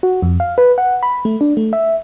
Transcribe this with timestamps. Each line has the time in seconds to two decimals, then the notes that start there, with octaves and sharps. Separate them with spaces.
0.03 F#4
0.22 F2
0.40 F5
0.58 B4
0.78 F#5
1.03 B5
1.25 A3
1.41 D4
1.57 A3
1.73 E5